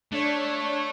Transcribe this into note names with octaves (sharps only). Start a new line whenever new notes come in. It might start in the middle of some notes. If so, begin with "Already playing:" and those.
A3 D4 C#5